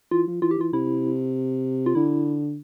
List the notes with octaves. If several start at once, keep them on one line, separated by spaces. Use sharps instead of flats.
E3 F4
F3
E3 F4
G4
E3 F4
C3 E4
F4
D3 E4